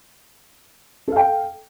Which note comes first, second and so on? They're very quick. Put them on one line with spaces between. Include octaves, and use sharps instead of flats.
A4 F5 G5